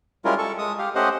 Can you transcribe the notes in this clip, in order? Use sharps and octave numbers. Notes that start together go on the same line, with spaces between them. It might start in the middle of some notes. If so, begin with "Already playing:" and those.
G3 G#3 C#4 E4 F4 A#4
A4 C#6
G#3 D#6
G4 F5
A3 C#4 G4 C5 D#5 F#5